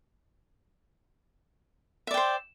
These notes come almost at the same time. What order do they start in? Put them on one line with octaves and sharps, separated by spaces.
E5 D5 G5 C5